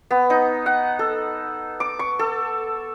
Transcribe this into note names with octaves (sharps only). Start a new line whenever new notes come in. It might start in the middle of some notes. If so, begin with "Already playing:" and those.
B3
D#4
F#5
A4
D6
C#6
A4